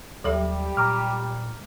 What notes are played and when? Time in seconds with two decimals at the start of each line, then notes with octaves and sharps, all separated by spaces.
0.24 D#2 F#3 G3 G4 A4 E5
0.77 A#2 A#5 D6 F6